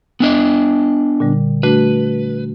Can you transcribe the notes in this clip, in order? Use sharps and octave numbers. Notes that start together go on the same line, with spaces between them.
B3 D4 D#5
A#2 D3 G3
A3 D4 F#4 B4